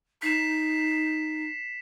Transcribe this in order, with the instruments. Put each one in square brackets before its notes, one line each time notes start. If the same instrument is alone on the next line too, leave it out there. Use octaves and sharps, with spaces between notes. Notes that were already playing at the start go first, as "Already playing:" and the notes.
[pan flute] D#4 [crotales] B6 C7 E7